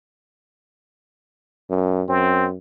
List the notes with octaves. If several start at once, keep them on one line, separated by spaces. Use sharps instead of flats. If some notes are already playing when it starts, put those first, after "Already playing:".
F#2
F#2 C4